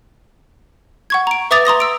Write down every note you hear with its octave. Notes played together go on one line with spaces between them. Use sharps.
F#5 C#6 G#6
A#5 D7
B4 E5 D6 D#6 A6 F7
A#5 C6 D#6 A#6
E6 D7